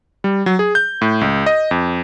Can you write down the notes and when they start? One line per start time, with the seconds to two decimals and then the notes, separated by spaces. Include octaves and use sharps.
0.24 G3
0.46 F#3
0.59 G#4
0.75 G6
1.01 A2
1.21 C#2
1.46 D#5
1.71 F2